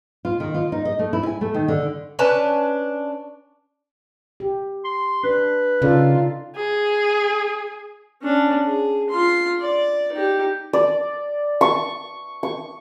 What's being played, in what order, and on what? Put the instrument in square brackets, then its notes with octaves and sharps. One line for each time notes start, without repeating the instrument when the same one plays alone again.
[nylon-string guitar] F4
D#3
F4
D#4
D#5
A3
E4
G#5
A3
D#3
D3
[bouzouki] C#4 D4 B4 A5
[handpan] G4
[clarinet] C6
[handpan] D4 [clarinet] B4
[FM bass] C#3 [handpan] D#4 A4 D5 [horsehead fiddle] F4
[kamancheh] G#4
[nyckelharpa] C#4 D4
G#4
F4 C6
D5
D#4 G4
[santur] D5
C#6
C#6